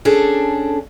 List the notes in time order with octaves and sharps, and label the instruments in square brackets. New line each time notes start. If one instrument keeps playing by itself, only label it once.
[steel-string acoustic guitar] C#4 D4 G#4 A4